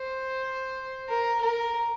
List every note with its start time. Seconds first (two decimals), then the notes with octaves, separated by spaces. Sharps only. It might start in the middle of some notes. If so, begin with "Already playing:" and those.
Already playing: C5
1.09 A#4
1.41 A#4